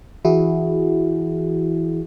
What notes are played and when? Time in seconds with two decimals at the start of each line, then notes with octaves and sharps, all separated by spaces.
0.25 E3 E4 F#4 G#4